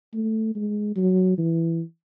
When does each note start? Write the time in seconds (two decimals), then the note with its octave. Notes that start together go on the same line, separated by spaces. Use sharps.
0.13 A3
0.56 G#3
0.96 F#3
1.38 E3